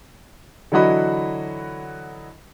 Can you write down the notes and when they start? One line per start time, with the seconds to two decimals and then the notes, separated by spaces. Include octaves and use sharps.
0.72 D3 E3 F#3 F#4 D#5 B5